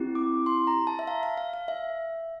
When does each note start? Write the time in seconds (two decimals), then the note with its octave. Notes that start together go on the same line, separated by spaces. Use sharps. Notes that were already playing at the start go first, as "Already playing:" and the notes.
Already playing: C4 E4 G4
0.15 D6
0.46 C6
0.67 A#5
0.87 A5
0.99 E5
1.07 F5
1.23 F5
1.38 F5
1.54 F5
1.68 E5